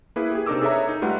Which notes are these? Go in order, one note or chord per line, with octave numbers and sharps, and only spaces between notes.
A#3 E4 G#4 B4
G4 G#4
C3 D4 D#4 A#4 D6 E6
G#4 A4 B4 C#5 E5 A#5
D#4
G3 A3 F4 B4 F#5